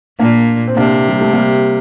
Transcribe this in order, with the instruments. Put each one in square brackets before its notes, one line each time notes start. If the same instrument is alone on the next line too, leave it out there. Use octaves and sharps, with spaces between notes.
[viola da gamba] A#2 [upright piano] A#3 D4
[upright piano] C4
[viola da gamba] C3 [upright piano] A#3 D4
[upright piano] G3
A3
G3 A#3